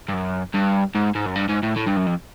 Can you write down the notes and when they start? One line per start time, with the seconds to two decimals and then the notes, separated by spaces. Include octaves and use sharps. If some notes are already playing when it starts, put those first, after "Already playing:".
0.09 G2
0.14 F#2
0.54 G2
0.95 G#2
1.15 G#2
1.26 F#2
1.36 G2
1.49 G#2
1.63 A2
1.76 A2
1.86 G2
1.96 F#2
2.06 F2